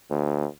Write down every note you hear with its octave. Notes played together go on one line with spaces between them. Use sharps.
D2